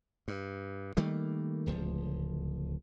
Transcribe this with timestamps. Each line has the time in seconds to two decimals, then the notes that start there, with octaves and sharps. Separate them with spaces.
0.28 G2
0.97 D#3 G3 A3 A#3
1.66 D1 C#2 F3